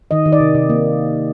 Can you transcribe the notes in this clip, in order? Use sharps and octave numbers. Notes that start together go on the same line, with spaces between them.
D#3 D#5
D#3
D5
C3
C3
A#3